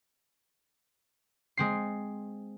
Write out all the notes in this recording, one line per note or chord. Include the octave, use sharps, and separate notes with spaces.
G#3 C4 C7